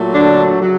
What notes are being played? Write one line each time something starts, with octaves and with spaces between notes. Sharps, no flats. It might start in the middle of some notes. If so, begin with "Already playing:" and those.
Already playing: A#2 F#3 A3
D3 D4
C#3 F#3